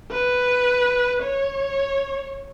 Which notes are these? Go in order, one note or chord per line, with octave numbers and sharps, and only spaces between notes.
B4
C#5